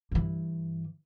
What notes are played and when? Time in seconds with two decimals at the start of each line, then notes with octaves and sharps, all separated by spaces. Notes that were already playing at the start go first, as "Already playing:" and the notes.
0.11 G2 E3